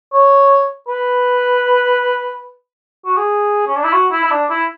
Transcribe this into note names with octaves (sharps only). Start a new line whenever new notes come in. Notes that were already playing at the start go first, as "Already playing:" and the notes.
C#5
B4
F#4
G#4
C#4
D4
E4
F#4
E4
E4
D4
E4